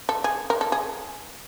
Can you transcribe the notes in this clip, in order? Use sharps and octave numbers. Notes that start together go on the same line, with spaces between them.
A4
G#4
A#4
A4
G#4